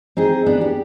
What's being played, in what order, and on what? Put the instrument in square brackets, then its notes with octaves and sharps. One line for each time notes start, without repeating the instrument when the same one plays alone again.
[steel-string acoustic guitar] C4 D#4 G#4
B3 D4
G4